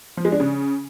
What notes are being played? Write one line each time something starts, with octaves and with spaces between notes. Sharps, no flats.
F3
G#3
D4
C#3